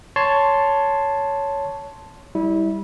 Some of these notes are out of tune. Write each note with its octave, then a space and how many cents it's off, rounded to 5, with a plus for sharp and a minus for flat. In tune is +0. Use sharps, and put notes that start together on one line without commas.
C#5 +10 A5 +0 C6 +0
G3 +0 E4 -25